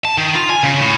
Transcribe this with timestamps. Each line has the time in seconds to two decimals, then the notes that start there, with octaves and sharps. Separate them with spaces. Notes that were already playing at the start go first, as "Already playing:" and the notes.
0.05 A5
0.18 D#3
0.36 F4
0.50 G#5
0.64 C#3
0.80 A2